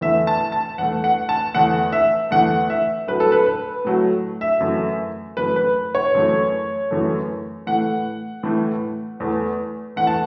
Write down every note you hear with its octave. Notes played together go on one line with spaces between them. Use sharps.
E2 E3 A3 E5
A5
A5
E2 E3 A3 F#5
F#5
A5
E2 E3 A3 F#5
E5
E2 E3 A3 F#5
E5
A2 F#3 A3 B4
A4
B4
B4
A2 F#3 A3
E5
F#2 E3 A3
F#2 E3 A3 B4
B4
C#5
F#2 E3 A3
F#2 E3 A3
A2 E3 A3 F#5
A2 E3 A3
E2 E3 A3
E2 E3 A3 F#5
A5